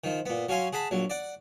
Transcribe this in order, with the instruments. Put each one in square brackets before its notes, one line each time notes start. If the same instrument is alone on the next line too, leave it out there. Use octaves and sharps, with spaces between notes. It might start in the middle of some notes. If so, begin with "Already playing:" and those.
[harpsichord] D#3 F3
A#2 B3
F#3 C#4 F5 G#5 C6
G#4 F#5 A5 B5
A#1 F#3
D5 F#5